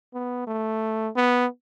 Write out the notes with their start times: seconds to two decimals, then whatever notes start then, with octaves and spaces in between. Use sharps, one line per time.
0.14 B3
0.47 A3
1.16 B3